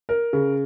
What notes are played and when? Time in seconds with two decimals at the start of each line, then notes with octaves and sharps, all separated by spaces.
0.09 A#4
0.33 C#3